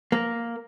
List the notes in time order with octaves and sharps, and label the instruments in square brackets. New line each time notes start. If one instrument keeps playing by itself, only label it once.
[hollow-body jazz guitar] A#3